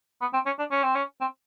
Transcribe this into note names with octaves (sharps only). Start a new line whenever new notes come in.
B3
C4
C#4
D4
C#4
C4
C#4
C4